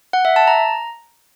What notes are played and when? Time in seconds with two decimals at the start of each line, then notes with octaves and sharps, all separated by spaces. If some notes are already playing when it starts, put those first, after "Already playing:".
0.13 F#5
0.25 E5
0.36 A5
0.48 A#5